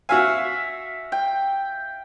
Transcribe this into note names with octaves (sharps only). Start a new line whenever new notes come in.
F#4 E5 F5 G#5
G5